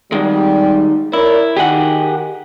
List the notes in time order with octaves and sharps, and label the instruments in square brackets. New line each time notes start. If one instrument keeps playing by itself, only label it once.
[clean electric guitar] D#3 G#3 [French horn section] G3
[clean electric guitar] E4 [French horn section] A#4 C#5 D5
[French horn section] D#3 [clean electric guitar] G4 G#4 F#5